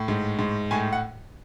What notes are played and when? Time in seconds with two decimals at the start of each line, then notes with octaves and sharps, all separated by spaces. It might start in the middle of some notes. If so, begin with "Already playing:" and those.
Already playing: A2
0.08 G#2
0.39 G#2
0.71 A2 G#5
0.93 F#5